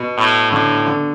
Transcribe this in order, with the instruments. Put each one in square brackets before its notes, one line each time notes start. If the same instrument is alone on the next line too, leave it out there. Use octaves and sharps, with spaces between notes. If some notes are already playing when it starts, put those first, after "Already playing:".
Already playing: [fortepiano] B2
[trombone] A2
[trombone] A2 [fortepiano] D3
[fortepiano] D3